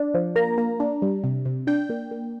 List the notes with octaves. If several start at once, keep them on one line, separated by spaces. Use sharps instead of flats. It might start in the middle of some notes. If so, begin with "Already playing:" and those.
Already playing: D4
F3
A#3 A#5
A#3
D4
G3
C3
C3
D4 G5
A#3
A#3